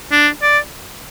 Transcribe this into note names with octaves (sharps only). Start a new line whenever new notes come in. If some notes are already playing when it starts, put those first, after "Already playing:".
D4
D5